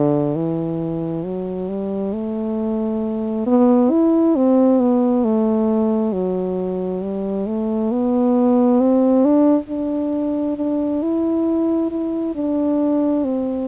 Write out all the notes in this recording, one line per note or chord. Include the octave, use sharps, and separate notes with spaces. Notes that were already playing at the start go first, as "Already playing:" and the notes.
Already playing: D3
E3
F#3
G3
A3
B3
E4
C4
B3
A3
F#3
G3
A3
B3
C4
D4
D4
D4
E4
E4
D4
C4